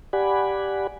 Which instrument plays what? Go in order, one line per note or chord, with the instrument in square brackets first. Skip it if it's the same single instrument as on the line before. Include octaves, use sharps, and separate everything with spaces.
[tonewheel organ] G4 D5 F#5 G#5 B5